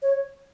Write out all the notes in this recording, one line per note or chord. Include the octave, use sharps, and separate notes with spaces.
C#5